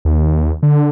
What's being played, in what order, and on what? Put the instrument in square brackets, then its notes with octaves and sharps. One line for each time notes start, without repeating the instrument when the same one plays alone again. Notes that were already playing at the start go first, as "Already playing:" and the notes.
[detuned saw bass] D#2
D3